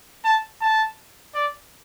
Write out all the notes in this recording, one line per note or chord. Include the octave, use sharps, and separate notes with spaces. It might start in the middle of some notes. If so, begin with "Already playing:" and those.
A5
A5
D5